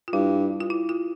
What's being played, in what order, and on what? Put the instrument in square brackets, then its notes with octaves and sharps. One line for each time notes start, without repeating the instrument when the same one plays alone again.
[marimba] F4
[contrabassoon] G2 [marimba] E4
[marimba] F4
E4
F4